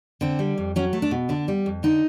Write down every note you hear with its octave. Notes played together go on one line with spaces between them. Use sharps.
D3 C4
G3
F2
F#3 C#4
A3
D4
B2
D3 D4
G3
F2
D3 D#4